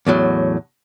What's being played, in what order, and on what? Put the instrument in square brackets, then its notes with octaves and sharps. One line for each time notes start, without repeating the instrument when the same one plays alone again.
[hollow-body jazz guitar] E2 A2 F#3